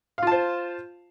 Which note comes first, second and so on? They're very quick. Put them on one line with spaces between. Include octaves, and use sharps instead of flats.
F5 F4 A5 C5